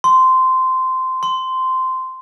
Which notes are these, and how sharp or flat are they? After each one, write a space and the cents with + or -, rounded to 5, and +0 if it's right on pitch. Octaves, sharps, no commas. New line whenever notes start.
C6 -15
C6 -10